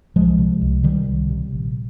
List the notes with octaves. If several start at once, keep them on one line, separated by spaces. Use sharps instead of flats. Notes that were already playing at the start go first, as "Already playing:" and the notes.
C2 F3 G#3
C3
C2
C3 D#3 G3
C2
C3
A#1